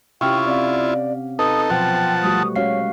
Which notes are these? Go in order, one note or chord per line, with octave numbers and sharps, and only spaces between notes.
C3 C#4 E4 F4 G4 G5 C#6 F6
C4 D5 F5
D#4 A4 B4 D#6
B2 F3 F#3 C5 F#5 G5 A5
G3 A3 F#4 D#6
G#3 C#4 F#4 C#5 F5 C7